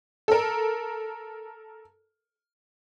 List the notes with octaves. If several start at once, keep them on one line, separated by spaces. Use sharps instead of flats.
A4 A#4